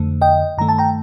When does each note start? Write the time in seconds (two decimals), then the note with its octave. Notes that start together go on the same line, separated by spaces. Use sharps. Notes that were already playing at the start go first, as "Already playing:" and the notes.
Already playing: F2 D3 A3
0.21 D#5 G5
0.58 G2 D#3 A3 A#5
0.69 A5
0.79 G5 A#5